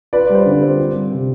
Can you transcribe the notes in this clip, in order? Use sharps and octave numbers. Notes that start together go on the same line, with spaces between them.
F4 B4 D5
G3
C5
D3
C4
F4
G3
C3